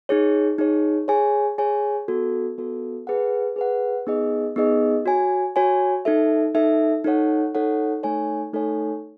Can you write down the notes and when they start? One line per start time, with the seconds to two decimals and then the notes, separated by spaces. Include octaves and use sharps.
0.09 D#4 G#4 C#5
0.58 D#4 G#4 C#5
1.08 G#4 C#5 G#5
1.58 G#4 C#5 G#5
2.08 B3 F#4 A4
2.58 B3 F#4 A4
3.07 G#4 B4 F#5
3.56 G#4 B4 F#5
4.07 B3 D#4 G#4 D#5
4.56 B3 D#4 G#4 D#5
5.06 F#4 C#5 G#5
5.56 F#4 C#5 G#5
6.05 D#4 A4 E5
6.55 D#4 A4 E5
7.04 D#4 A4 C#5 F#5
7.55 D#4 A4 C#5 F#5
8.03 A3 D#4 A4 C#5 G#5
8.53 A3 D#4 A4 C#5 G#5